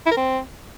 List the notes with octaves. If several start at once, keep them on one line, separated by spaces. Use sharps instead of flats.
E4
A#4
C4